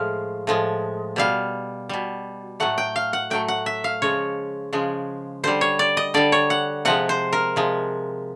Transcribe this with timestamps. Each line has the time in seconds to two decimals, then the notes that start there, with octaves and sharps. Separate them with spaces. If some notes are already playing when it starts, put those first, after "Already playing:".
Already playing: A2 F3 G#3 F5
0.47 A2 F3 G#3
1.16 B2 G3 F5
1.89 B2 G3
2.60 A2 F#3 A3 F#5
2.78 G5
2.96 F5
3.13 F#5
3.30 A2 F#3 A3 G5
3.48 F#5
3.66 E5
3.84 F5
4.02 C#3 F3 G#3 C#5
4.73 C#3 F3 G#3
5.43 D3 G3 C5
5.61 C#5
5.79 D5
5.97 D#5
6.14 D3 G3 D5
6.32 C#5
6.50 F#5
6.85 C3 F3 G#3 F#5
7.09 C5
7.33 A#4
7.56 C3 F3 G#3